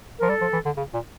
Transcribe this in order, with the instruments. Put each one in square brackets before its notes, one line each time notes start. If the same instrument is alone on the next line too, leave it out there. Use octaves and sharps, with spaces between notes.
[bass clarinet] F3 [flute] A#4
[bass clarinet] G3 [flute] A4
[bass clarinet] F3
E3
D3
C#3
A#2